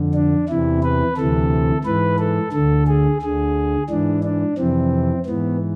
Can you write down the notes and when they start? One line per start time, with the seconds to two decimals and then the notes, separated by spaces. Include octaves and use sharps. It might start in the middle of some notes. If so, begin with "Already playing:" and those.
Already playing: F2 D3
0.14 D4
0.48 E2 C3 E3 E4
0.82 B4
1.17 D2 C3 E3 A4
1.85 G#2 E3 B4
2.19 A4
2.53 D2 D3 A4
2.87 G#4
3.21 D2 D3 G#4
3.90 G#2 E3 D4
4.23 D4
4.57 F2 C3 E3 C4
5.26 G#2 E3 B3